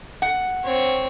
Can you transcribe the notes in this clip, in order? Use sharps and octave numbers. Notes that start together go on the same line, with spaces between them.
F#5
C4 C#5